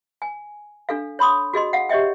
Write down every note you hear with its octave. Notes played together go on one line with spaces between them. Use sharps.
G#5
D4 A4 F5
C#5 B5 C6 D#6
F#4 G#4 D#5 C6
F5 F#5
G4 C#5 D#5 E5 G5